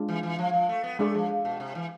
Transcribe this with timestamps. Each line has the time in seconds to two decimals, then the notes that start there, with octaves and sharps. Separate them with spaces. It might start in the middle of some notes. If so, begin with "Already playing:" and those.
Already playing: G#3 D4 F4
0.09 E3
0.23 E3
0.39 F3
0.53 F3
0.69 A3
0.84 B3
0.99 G#3 A3 D4 G#4 D5
1.14 F3
1.45 B2
1.60 C3
1.75 E3